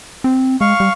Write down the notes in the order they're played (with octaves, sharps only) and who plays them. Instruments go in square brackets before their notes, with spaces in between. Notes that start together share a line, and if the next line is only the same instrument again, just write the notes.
[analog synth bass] C4
[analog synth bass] G#3 [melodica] F5 C#6
[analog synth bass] G3